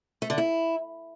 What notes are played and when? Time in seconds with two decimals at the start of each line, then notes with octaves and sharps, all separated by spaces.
0.22 A3
0.30 D3
0.38 E4